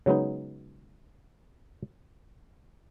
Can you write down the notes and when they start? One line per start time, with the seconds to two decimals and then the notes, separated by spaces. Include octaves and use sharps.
0.06 C#3 F#3 G#3 B3 D#4